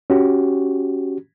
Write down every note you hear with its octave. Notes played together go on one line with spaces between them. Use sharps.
C#4 F#4 G4